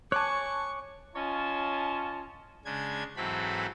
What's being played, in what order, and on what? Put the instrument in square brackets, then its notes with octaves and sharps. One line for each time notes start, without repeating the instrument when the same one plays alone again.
[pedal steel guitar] C#5 G#5 [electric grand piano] A5 D6 F#6 [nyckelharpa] C#6
[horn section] C#4 F4 C#5 D#5 A5
[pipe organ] C#3 G#3 D4 G#6
G#2 E3 F#3 C4 A4 B5